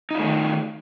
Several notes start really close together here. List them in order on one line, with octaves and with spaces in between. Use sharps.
D#4 F4 A3 D#3